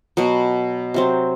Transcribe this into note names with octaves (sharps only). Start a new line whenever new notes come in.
B2 F#3 B3
C3 F#3 C4